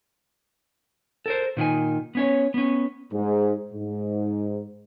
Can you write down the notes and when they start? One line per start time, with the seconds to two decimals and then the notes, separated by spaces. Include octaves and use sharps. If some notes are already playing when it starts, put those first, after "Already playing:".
1.26 A4 A#4 C5
1.57 A#2 D#3 B4 G#5
2.15 B3 C#4 C#5
2.54 B3 C#4
3.13 G#2
3.74 G#2